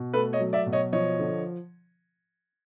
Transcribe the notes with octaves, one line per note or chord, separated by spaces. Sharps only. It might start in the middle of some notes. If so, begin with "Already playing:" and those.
Already playing: B2
A3 A4 B4
C#5 D#5
F#3
D5 E5
B2
C#5 D#5
F3 C#5 D#5
D3